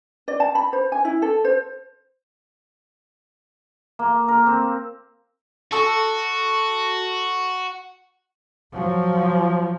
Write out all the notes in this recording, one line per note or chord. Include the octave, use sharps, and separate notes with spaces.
D5
A5
B5
C5
G#5
E4
A4
C5
A#3
A#4
C4
F#4 A4 C#6
F3 F#3